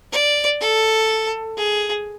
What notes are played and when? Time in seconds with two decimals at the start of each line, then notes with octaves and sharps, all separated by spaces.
0.12 D5
0.61 A4
1.57 G#4